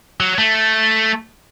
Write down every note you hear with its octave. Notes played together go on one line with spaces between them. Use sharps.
F#3
A3